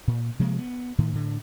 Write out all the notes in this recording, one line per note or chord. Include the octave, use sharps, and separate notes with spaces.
A#2
C3 F3 G#3 A#3
B3
A2 D#3
A2 D3